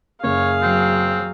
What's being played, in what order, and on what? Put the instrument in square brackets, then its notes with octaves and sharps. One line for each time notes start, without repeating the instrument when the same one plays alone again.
[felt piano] F#1 [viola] G#4 F5 [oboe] C#5
[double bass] F#3 [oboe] C4